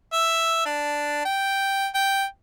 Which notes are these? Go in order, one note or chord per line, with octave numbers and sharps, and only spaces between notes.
E5
D4
G5
G5